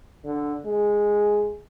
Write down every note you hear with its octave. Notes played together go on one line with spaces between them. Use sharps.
D3
G#3